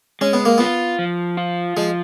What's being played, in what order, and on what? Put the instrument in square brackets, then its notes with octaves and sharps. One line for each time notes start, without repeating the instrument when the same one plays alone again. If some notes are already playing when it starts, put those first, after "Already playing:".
[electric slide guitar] G#3 [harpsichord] C#4
[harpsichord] B3
A#3
[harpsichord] B3 [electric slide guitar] F4
[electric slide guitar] F3
F4
[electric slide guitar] F3 [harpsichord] G#3